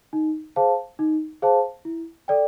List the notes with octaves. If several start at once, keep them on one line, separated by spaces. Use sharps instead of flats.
D#4
G#4 C5 F5 A5
D#4
G#4 C5 F5 A5
E4
A4 D5 G5